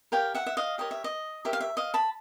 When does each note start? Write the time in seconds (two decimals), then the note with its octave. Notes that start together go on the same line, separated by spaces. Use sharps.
0.12 G4 A#4 C#5 F5 G5
0.35 E5 F#5
0.46 E5
0.57 D#5 F5
0.78 G4 A#4 C#5 D#5
0.91 E5
1.04 D#5
1.45 G4 A#4 C#5 E5
1.53 F5
1.61 E5
1.77 D#5 F5
1.94 A5 B5